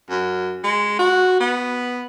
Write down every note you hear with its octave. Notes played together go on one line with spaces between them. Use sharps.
F#2
G#3
F#4
B3